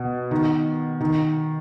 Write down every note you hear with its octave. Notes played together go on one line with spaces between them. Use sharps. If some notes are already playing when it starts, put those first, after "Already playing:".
Already playing: B2
D#3
D#3